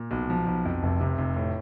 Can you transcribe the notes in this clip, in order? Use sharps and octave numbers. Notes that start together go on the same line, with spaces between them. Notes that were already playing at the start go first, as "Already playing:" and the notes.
Already playing: A#2
B1
F3
B1
F2
F1
C3
F1
A2